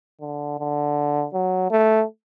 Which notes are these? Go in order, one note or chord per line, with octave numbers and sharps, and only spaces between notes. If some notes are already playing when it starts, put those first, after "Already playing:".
D3
D3
F#3
A3